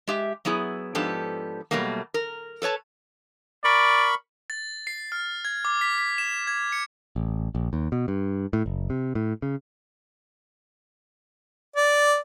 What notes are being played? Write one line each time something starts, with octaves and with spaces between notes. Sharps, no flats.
G#3 G4 E5
F#3 B3 E4 G#4
G#2 F3 B3 D4 G4 A4
B2 F#3 G3 A3 A#3
A#4
A4 B4 C#5 A5
A#4 D5 B5 C#6
A6
C7
F6
G#6
D6
B6
B6
E7
G#6
C#7
A1
A#1
D#2
B2
G2
A2
F#1
C3
A2
C#3
D5